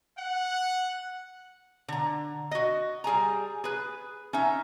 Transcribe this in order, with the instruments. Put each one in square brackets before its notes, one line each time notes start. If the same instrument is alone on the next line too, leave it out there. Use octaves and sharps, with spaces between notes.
[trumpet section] F#5
[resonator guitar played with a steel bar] D3 A#5
F#4 D#5
G3 G#4 G#5 A#5
G#4 B4
C#4 D#4 E5